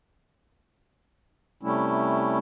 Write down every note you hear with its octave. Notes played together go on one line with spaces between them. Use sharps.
C3 G3 A3 C#4 E4